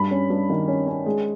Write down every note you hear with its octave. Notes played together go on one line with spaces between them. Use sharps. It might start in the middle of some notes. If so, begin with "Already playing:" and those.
Already playing: G2 B5
C#4
G2
D#3
C#4
C#4
G#3